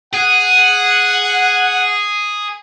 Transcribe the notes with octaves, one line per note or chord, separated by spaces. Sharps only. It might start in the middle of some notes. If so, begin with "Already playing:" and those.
G#4 F#5